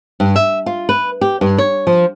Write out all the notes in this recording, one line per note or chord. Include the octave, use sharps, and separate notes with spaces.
G2
E5
F4
B4
G4
G2
C#5
F3